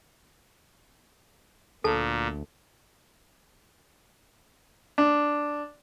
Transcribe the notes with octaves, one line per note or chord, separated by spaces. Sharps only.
D2 A#2 A4 A5
D4